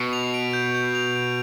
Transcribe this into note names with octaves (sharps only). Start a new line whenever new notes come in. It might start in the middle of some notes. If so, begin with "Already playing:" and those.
Already playing: B2
F7
D7
G6
G6
F7
D7